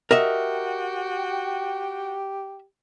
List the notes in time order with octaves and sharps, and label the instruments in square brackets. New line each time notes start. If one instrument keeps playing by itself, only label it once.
[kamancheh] F#4 G5 [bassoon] G4 [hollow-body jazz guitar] A#4 D#5 E5